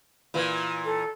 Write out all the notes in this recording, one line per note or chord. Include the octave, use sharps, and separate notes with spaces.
A#2 E3
A4